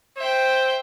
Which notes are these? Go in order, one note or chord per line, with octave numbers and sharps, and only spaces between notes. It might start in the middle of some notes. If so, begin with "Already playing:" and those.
C5 E5 G5